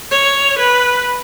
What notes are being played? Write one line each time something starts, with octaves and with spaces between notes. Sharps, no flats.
C#5
B4